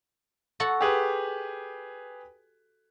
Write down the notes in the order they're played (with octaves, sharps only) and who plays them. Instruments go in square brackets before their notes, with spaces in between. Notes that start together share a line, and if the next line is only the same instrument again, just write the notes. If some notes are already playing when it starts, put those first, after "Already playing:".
[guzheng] F#4 A4 F#5
[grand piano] G4 G#4 B4